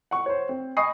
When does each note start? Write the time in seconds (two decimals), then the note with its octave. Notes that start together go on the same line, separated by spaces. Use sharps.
0.11 F#5 C#6
0.26 C5 C#5
0.49 C4
0.77 D#5 G#5 B5 C#6 D#6 C7